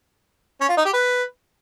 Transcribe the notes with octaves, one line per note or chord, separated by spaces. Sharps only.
C#4
F4
D#4
G4
B4